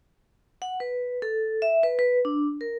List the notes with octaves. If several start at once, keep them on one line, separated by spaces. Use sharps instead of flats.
F#5
B4
A4
E5
B4
B4
D4
A#4